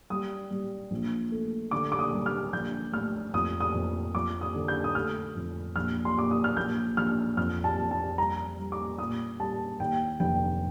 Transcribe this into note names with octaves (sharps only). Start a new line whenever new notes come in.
G3 D#6
G3
A#1
A3
D3 D6
D6
D#6
G3
F6
A#1 G6
A2 F6
F2 D#6
D#6
F2
F3 D6
D#6
D3
G6
D#6
A3 F6
F2
A#1 F6
C6
A#2 D6
D#6
F6
A#1 G6
A#1 F6
F2 F6
A5
F2
A5
G3 A#5
G3
D6
A#2 D#6
G3 A5
D#2 G5
F1 G5